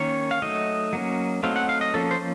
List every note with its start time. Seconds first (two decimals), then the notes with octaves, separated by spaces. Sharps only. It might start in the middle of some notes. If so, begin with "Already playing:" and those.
Already playing: D#3 A#3 C#4 C#5
0.31 F5
0.42 F#3 A3 D#4 D#5
0.93 F#3 A#3 C#4
1.43 F#3 A3 C4 D#4 F5
1.56 F#5
1.69 F5
1.81 D#5
1.94 F3 A#3 C#4 A4
2.11 C5